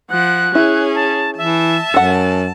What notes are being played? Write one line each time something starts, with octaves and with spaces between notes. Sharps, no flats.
F3 F#5 F#6
C#4 E4 G#4
A5
E3 E5 A5
F#2 A4 F#5